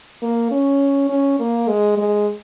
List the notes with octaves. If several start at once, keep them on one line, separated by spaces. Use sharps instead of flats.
A#3
C#4
C#4
A#3
G#3
G#3